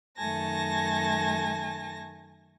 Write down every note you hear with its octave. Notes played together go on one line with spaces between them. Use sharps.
F#2 D#3 A3 G#5 A5 A#6